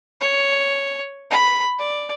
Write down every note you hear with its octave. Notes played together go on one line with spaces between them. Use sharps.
C#5
B5
D5